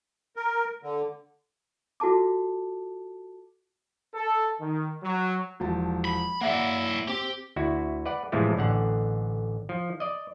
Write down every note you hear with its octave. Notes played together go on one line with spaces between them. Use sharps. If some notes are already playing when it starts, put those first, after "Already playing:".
A#4
D3
F4 F#4 A4 A5 D6
A4
D#3
F#3
E1 F3 A5
B5
A#3 E4 D5 E5 F#5
C4 G4
D2 E4 F#4
B4 D5 F#5
A2 C3 E3 F3 G#3 A3
A1 D3 F#5
F3
D5 D#5